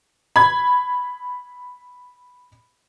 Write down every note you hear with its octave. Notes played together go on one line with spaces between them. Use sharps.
B5 G#6